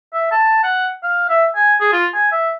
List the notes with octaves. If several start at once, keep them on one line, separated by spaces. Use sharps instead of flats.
E5
A5
F#5
F5
E5
G#5
G#4
F4
G#5
E5